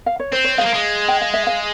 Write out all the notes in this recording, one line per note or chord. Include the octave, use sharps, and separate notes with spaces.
F5
C#5
C4 C5
C#5
G#3 F5
A#3
G#3
G5
F5
E5
F5